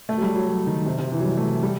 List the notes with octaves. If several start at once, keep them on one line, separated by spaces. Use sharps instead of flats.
A3
F#3
G3
F#3
F#3
D#3
C3
C3
E3
F#3
G3
A3
G3